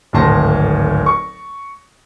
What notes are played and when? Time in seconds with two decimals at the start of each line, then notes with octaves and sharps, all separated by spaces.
0.13 D1 G#1 A2 A5 C6 A#6
1.06 C#6